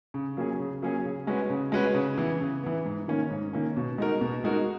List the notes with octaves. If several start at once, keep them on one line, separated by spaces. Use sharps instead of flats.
C#3
F#3 A#3 C#4 G#4
C#3
F#3 A#3 C#4 G#4
C#3
G#3 C#4 F#4 B4
C#3
G#3 C#4 F#4 B4
C#3
E3 B3
C#3
E3 B3
G#2
D#3 A#3 C#4
G#2
D#3 A#3 C#4
B2
G#3 D#4 F#4 A#4
B2
G#3 D#4 F#4 A#4